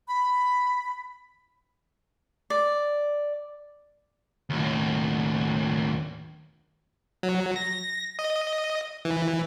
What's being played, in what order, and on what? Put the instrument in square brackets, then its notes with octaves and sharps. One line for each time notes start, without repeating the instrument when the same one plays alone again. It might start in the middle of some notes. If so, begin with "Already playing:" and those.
[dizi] B5
[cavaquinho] D5
[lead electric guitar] D#2 A2
[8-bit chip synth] F#3
A#6
D#5
E3